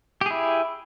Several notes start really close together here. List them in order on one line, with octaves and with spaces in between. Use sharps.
G4 G#4 E4